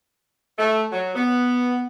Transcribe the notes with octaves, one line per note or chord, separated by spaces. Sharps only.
A3
F#3
B3